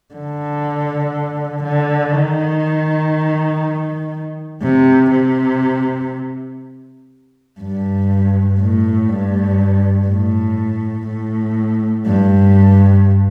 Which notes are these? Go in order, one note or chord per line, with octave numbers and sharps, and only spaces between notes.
D3
D3
D#3
C3
C3
G2
A2
G2
A2
A2
G2